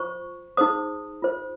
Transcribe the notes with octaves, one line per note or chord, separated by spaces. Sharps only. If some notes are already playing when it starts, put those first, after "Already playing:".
Already playing: F4 C5 C#6
D#4 G#4 C5 D#6
F4 C5